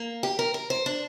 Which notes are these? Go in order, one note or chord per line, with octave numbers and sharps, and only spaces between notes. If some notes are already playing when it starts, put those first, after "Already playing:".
Already playing: A#3
G4
A#4
A#4
C5
D4